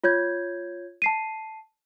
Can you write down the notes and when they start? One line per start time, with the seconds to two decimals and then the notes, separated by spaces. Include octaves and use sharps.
0.04 F4 C#5 G6 G#6
1.02 A5 C7 D#7